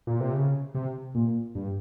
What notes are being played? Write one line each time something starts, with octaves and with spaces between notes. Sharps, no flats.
A#2
C3
C#3
C3
A#2
G2